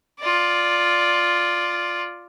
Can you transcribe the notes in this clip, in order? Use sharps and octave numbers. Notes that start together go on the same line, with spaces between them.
F4 D5